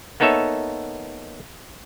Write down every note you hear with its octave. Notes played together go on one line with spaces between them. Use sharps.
A#3 B3 D#4 A4 C#5 E5